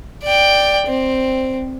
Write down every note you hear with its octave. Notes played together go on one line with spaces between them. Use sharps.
D5 G5
C4